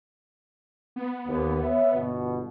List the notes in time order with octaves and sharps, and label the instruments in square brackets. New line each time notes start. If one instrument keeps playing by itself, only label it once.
[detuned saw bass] B3
[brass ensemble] D#2
C#5 E5
G1 B2